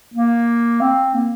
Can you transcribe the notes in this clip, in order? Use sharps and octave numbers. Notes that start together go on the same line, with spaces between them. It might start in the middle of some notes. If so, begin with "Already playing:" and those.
A#3
C4
A#3